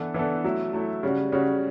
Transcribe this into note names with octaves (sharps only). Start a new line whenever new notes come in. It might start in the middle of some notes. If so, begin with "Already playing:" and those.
Already playing: E3 B3 D4 A4
E3 B3 D4 A4
F#3 A3 E4
F#3 A3 E4
C#3 G3 C#4 F#4
C#3 G3 C#4 F#4